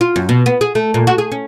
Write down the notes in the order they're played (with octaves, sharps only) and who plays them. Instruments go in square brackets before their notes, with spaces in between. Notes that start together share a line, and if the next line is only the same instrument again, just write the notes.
[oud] F4
F#2
B2
B3
G#4
A3
A#2
F#4
G#4
C#4